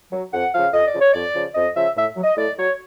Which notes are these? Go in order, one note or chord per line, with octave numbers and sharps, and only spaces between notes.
F#3
F2 F#5
C#3 F3 F5
F2 D#5
D5
C#3 F3
C#5
F2 D5
C#3 F3
F2 D#5
C#3 F3 E5
A2 E5
F#3
D#5
A2 D5
F#3 C#5